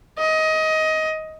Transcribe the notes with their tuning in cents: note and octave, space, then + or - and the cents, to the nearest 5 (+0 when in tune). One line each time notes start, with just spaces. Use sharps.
D#5 +20